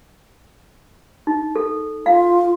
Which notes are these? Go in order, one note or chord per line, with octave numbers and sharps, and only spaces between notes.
D#4
A4
F4 F5